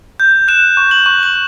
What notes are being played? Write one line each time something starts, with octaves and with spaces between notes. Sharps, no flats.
G6
F#6 E7
C#6
F#7
C#6
F#7